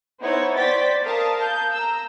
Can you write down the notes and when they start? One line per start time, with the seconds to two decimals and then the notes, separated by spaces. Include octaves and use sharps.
0.22 B3 D#4 E4 C5 C#5
0.54 C5 D5 G5 A6 B6
1.03 A#4 F5 A5 D#6
1.42 G6
1.74 A#5 E6